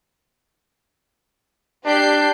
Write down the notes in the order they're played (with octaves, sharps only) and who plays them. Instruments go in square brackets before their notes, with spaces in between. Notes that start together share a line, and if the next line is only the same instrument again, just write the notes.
[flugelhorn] D4 [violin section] G4 G6 C7